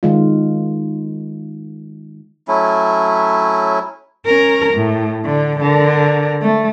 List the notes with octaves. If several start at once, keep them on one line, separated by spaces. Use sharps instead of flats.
D#3 G#3 F4
F#3 A3 C#4 E4
C#4 A#4
A2
D3
D3 A#4
A3